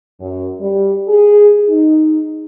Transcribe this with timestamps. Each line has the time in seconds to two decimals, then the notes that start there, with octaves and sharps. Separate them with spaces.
0.20 F#2
0.60 G3
1.09 G#4
1.68 D#4